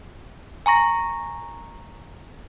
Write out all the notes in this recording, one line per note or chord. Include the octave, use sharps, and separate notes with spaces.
G#5 A#5 C#6 A#6